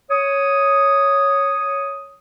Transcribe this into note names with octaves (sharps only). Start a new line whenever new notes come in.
C#5 D#6